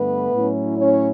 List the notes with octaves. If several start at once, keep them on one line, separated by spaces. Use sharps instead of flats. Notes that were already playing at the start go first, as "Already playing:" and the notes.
Already playing: G2 D3 A3 B3 B4
A2 F#3 C#4 E4
C#4 C#5